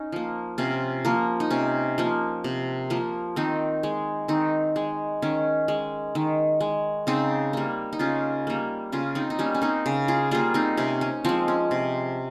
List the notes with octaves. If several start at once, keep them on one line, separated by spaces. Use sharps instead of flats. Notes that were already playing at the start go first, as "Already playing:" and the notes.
Already playing: C#4 D#4
F3 A#3
C3 C#4 F4
F3 A#3
D#4
C3 C#4
F3 A#3
C3
F3 A#3
D#3 C4 D#4
G#3
D#3 C4 D#4
G#3
D#3 C#4
G#3
D#3
G#3
C#3 C4 D#4
G3 A#3
D#4
C#3 C#4 F4
G3 A#3
C#3 C#4 F4
C4 D#4
D#4
G3 A#3 C#4
C#4
C4 D#4
C#3
F4 G#4
G3 A#3 F4 G#4
C4 D#4
C3 C#4
C#4
F3 G#3 C4
C#4
C3